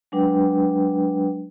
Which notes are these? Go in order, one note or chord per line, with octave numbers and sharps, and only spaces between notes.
F#3 G#3 D4 B4 G5